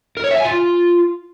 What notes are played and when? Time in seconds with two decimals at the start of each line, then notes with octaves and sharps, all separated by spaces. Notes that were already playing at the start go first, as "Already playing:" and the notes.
0.17 A#4
0.24 C#5
0.31 E5
0.38 G#5
0.45 F4